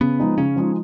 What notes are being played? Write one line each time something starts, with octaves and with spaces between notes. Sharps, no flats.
C#3 B3
F3 G#3 D#4
C#3 C#4
F3 G#3 D#4